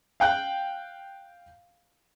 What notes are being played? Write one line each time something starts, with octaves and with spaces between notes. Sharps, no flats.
F5 G5 F#6